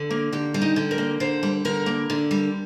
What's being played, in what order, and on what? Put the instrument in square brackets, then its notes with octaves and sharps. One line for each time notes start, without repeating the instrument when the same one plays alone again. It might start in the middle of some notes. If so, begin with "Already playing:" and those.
Already playing: [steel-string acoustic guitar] D3
A#3
D3 G4
G3
D#4
D3
A#4
A#3
D3 C5
G3
D3 A#4
A#3
D3
G3